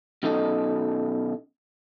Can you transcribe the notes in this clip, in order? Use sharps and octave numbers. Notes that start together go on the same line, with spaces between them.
B2 F#3 C#4 D#4 A4 D#5